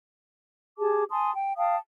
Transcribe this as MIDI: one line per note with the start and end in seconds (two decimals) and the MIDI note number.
0.78 1.04 67
0.78 1.04 68
0.78 1.04 81
0.78 1.04 86
1.11 1.32 80
1.11 1.32 81
1.11 1.32 84
1.11 1.32 87
1.34 1.53 79
1.57 1.77 77
1.57 1.77 79
1.57 1.77 81
1.57 1.77 87